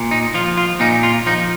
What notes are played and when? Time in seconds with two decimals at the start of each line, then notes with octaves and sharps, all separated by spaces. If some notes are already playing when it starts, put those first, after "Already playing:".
Already playing: A#2
0.11 D#4
0.34 F3 F4
0.58 F4
0.80 A#2 D#4
1.03 F4
1.26 F3 D#4